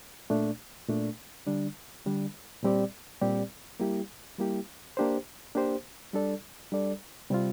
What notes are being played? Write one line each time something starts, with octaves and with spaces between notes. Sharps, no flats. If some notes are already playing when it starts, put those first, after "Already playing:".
A#2 A3 D4
A#2 A3 D4
D3 G3 D4
D3 G3 D4
A#2 G3 C4 G4 D5
A#2 G3 C4 G4 D5
G3 A#3 E4 G4
G3 A#3 E4 G4
A#3 D4 G4 C5
A#3 D4 G4 C5
G3 D4 A4 D5
G3 D4 A4 D5
C3 G3 C4 F4